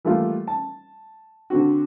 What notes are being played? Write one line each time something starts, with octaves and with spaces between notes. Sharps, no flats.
E3 G3 A3 A#3 F4
A5
D3 C4 F#4